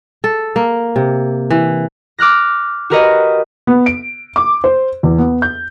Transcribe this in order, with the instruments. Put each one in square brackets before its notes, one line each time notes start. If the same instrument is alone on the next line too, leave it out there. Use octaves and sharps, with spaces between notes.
[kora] A4
A#3
C3
E3
[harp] D6 F6 F#6 A#6
F#4 G4 A#4 B4 C#5 D#5
[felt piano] B3
D7
D6
C5
E2
B3
G6